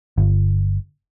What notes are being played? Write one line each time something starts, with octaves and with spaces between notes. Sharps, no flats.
G1